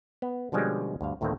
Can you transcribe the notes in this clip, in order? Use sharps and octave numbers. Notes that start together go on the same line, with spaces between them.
B3
B2 D3 F3 G3 G#3 C#4
D2 G2 F5
D2 A2 D#3 A3 A#3 C4